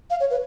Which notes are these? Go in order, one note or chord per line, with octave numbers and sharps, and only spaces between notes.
F5
C#5
B4